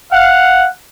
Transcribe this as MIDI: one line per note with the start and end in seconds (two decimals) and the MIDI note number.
0.12 0.67 77
0.12 0.67 78